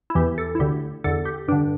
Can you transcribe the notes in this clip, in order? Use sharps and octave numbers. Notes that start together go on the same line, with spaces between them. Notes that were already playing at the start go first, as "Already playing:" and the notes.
E4
E2 E3 G4
A4
E4
D2 D3 G4
E2 D3 A4
G4
G2 D3 D4